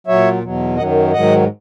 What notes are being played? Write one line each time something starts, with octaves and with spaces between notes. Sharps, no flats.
A#2 F#3 C#5 E5
E2 B2 F#3
F#2 D#3 F#3 D#5 F#5
G#2 D#3 F#3 D#5 F#5